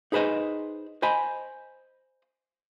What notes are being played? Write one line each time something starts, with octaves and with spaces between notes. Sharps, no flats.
D#4 G#4 B4 C5 D#5
C5 D#5 G#5 B5